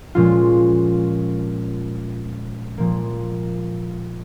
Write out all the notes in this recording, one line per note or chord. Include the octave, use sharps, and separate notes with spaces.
A#2 F3 G#3 C#4 F4
A#2 F3 A#3